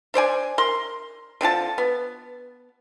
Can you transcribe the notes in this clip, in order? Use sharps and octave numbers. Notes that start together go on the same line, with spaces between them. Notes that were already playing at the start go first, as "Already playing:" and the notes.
D4 C5 D5 G#5
A#4 C6
D3 C4 F4 A5
B3